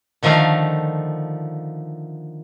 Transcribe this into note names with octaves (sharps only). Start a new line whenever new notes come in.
D3 D#3 F3 A3 F5 A#5